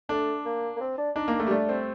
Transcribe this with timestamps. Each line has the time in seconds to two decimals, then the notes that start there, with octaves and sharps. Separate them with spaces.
0.09 A3 D4
0.45 A#3
0.76 A#3
0.80 C4
0.98 D4
1.16 D4 D#4
1.28 A#3
1.40 A3
1.47 G3
1.51 A3 D4
1.69 C4